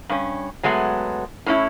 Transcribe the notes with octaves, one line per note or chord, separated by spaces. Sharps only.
G2 C#4
F#3 G#3 A3 B3
A2 C#4 E4